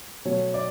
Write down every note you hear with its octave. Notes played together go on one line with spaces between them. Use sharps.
B2 F#3 A3 C#5
D5